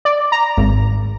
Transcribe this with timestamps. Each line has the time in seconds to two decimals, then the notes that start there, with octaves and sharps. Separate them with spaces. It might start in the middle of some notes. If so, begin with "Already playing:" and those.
0.05 D5
0.32 A#5
0.57 G#1